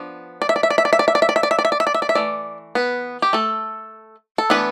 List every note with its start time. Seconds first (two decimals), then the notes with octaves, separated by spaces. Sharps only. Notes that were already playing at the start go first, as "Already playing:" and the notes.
Already playing: F3 B3 D4
0.42 D5
0.49 E5
0.56 D5
0.63 E5
0.70 D5
0.78 E5
0.85 D5
0.93 E5
0.99 D5
1.08 E5
1.15 D5
1.22 E5
1.29 D5
1.36 E5
1.43 D5
1.51 E5
1.59 D5
1.65 E5
1.72 D5
1.80 E5
1.87 D5
1.94 E5
2.02 D5
2.09 E5
2.15 E3 A3 D5
2.75 B3 B4
3.22 G4
3.33 A3 A4
4.38 A4
4.50 E3 A3 B3 D4 B4